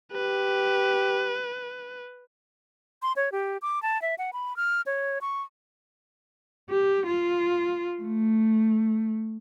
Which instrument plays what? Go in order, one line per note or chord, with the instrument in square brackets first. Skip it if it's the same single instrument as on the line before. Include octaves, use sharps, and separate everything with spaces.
[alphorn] G4 [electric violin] B4
[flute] C6
C#5
G4
D6
A5
E5
F#5
B5
F6
C#5
C#6
[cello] G4
F4
A3